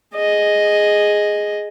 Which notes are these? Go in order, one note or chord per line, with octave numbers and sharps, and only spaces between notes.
G#4 D#5